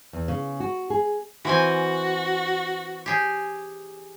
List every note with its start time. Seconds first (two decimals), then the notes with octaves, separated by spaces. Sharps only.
0.13 E2
0.28 C#3
0.60 F#4
0.90 G#4
1.45 E3 C4 F#4 G#5
3.06 G4 G#4